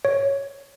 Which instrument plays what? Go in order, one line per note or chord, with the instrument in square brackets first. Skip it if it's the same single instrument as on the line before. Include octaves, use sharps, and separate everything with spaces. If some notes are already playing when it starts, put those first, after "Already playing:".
[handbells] C#5